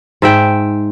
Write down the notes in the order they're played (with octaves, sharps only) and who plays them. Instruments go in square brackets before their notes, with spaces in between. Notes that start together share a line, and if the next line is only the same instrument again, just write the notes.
[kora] G#2 E5 G5